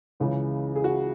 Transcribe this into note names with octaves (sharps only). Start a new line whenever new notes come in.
C#2 C#3 E3
G#4
F#4